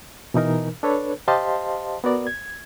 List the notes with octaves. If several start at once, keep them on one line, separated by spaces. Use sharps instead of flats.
B2 E3 D#4 A#4
D4 A4 B4 C#5
G4 C5 D#5 F5 A5 C6
B3 F#4 A#4 D5
G#6